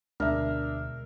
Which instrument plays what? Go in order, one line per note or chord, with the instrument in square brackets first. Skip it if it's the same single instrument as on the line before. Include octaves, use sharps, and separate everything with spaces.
[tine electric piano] D2 [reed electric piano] B2 G#3 [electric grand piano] D4 E5 [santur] A#4